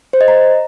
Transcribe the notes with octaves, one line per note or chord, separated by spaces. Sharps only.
C5
D#5
A#5